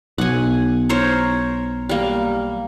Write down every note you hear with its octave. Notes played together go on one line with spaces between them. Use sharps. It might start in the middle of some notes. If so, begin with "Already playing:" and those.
B1 F#5 G#5
A#4 C5 C#5
G3 A#3